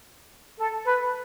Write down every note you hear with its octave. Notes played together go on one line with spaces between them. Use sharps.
A4
B4